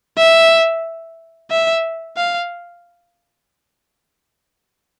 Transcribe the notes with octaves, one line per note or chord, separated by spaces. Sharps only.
E5
E5
F5